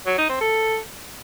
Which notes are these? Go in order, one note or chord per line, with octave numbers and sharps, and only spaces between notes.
F#3
D#4
C4
A4